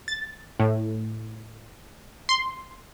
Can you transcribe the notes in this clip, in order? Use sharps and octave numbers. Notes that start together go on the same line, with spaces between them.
A6
A2
C6